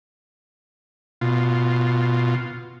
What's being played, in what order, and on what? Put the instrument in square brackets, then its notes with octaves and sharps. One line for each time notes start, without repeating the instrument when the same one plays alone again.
[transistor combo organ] B2 F4